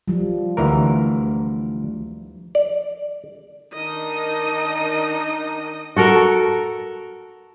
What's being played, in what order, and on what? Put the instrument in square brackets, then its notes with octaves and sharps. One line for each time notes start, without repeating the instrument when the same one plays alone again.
[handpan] F3 G3
[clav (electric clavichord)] D2 E3 A#4
D5
[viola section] D#3 D4 [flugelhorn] D#4 [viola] D#5
[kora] F#4 A4 A#4